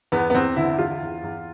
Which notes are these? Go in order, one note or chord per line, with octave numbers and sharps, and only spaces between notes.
E2 B3
B3
E2 C4
D3 E4
E2 F4
E2
E2